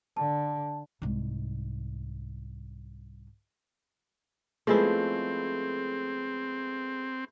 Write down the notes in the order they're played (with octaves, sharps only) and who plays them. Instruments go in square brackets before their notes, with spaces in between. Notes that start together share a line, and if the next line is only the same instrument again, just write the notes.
[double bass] D3 [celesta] A5
[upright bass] C2 G#2
[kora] F3 G#3 E4 [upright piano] A3 B3 [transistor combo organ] C4 [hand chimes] G#4